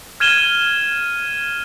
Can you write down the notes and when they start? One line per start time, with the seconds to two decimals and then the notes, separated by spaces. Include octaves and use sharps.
0.20 F6 G#6 D#7 E7 G7